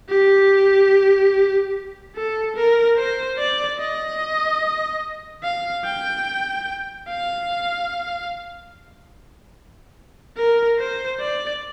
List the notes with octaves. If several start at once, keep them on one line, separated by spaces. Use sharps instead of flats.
G4
A4
A#4
C5
D5
D#5
F5
G5
F5
A#4
C5
D5